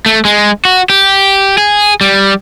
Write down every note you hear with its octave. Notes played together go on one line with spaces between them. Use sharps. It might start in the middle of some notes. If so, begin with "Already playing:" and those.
A3
G#3
F#4
G4
G#4
G3